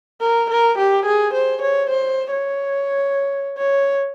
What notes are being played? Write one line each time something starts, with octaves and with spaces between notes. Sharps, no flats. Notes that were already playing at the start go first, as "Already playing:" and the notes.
A#4
A#4
G4
G#4
C5
C#5
C5
C#5
C#5